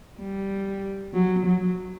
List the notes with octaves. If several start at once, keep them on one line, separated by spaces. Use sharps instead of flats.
G3
F#3
F#3